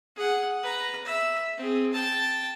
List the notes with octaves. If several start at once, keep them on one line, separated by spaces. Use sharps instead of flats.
G#4 F#5
B4 A#5
E5
C4 G#4
G5 A5